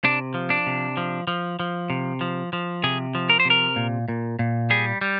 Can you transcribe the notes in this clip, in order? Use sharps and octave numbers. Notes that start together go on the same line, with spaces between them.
C3 D4
F3
D4
C3
F3
F3
F3
C3
F3
F3
C3 G#4
F3
A#4
C5
C3
A#4
A#2
A#2
A#2
G3 G#4
G3